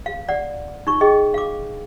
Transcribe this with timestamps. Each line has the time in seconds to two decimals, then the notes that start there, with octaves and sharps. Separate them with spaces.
0.06 F5
0.29 D5 F#5
0.87 D#4 C#6
1.01 G#4 D#5 G5
1.34 F5 D6